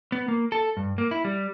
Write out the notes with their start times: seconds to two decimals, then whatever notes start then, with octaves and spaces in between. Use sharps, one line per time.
0.12 B3
0.28 A#3
0.52 A4
0.77 G2
0.98 A#3
1.11 E4
1.25 G3